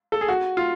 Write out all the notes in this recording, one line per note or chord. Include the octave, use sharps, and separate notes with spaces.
A4
G#4
F#4
F4